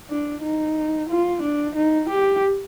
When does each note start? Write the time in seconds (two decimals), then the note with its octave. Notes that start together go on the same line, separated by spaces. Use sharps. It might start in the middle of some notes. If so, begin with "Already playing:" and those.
0.10 D4
0.42 D#4
1.09 F4
1.42 D4
1.75 D#4
2.10 G4